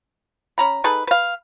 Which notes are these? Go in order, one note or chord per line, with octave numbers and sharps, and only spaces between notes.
C#4 A#5 B5
D#4 G#4 A4 B4
B4 F5